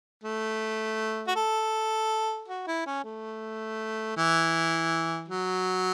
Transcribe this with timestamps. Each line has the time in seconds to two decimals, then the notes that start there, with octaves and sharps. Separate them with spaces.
0.23 A3
1.27 F#4
1.36 A4
2.48 F#4
2.67 E4
2.86 C#4
3.04 A3
4.16 E3
5.28 F#3